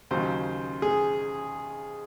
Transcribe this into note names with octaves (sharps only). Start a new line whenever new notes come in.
D#2 C#3 F#3 C5
G#4